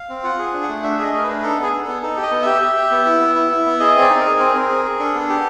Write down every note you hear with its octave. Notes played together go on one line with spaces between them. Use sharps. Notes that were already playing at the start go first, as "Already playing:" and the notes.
Already playing: F5
C4
F4 F#5
G#4
D4
F#5
A3
D4 E5
G#4 D#5
A3 A#4
D4 B4
D#4 A4
B3
G#4
B3
A4
B3
D#4 A4
G4
D#5
B3
G4 E5
G4
G4
B3
E4
B3
E4
E4
B3
G#4 D#5
C4
D5
D#4
G#4 A#4
C4
C4
G#4
G#4
D4 A4
B3
G4